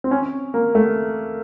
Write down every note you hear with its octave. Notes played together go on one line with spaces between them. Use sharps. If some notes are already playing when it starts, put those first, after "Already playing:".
C4
C#4
A#3
A3